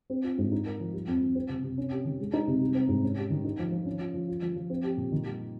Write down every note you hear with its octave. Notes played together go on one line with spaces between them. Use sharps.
C4
F4
G#2
D#4
A#4
F3
G3
F2
F2
C4
C3
C3
C#4
G4
D#3
G#3
D#4
C3
G3
C4
G#2
C#4
G4
D#3
D#4
F3
F3
C#4
F4
F3
F4
F3
F3
C4
G4
A#2
D#3
G3